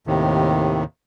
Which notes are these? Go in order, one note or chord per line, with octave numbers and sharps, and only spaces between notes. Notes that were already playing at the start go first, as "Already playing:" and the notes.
D#2 A2 C3 D#3